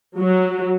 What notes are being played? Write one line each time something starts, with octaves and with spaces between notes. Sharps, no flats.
F#3